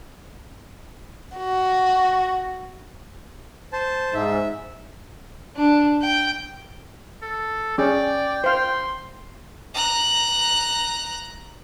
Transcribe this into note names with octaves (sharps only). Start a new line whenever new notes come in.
F#4
C5 A5
G#2 E5
D4
G5
A4
C#4 G#4 D5 G5
C5 F5 C6
A#5 F#6